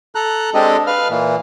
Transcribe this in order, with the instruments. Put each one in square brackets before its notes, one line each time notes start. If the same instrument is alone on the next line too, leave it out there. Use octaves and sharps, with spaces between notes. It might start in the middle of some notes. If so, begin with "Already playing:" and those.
[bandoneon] A4 A#5 F#6
G#3 C4 D4 G4 A4 D#5
B4 F5 F6
A#2 E3